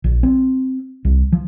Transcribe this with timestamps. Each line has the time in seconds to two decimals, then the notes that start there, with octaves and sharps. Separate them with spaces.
0.04 A#1
0.23 C4
1.05 C2
1.32 F3